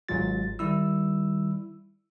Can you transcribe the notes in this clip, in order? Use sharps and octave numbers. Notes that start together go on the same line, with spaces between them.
G#1 G#2 F#3 G#3 F4 A6
D#3 G3 E4 E6